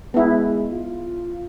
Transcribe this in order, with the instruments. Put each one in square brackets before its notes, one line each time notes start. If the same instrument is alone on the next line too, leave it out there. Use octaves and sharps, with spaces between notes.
[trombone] G#3 [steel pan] B3 E4
[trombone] F4